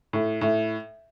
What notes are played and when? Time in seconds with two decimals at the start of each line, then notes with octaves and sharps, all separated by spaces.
0.13 A2
0.41 A2